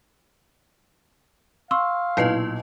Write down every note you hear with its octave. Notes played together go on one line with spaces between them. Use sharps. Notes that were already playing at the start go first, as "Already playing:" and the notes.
F5 C6 C#6 E6
B1 A#2 E4 B4 D#5 C7